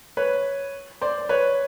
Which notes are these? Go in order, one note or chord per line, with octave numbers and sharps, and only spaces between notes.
B4 C#5
C5 D5
B4 C#5